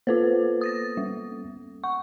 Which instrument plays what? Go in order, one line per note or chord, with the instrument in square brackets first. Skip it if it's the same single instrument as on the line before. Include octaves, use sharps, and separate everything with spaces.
[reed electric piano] A#3 B3 A4 [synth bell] F4 B4 C5
[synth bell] D#6 A6 A#6
G3
[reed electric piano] F#5 [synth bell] C#6